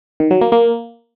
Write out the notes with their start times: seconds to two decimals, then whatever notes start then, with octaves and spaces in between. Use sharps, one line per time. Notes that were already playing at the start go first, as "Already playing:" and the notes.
0.20 D#3
0.31 F#3
0.41 A#3
0.52 A#3